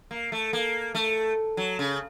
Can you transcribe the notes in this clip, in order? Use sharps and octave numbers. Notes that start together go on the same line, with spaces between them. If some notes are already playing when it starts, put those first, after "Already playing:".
A#3
A3
A#3
A3
F#3
C#3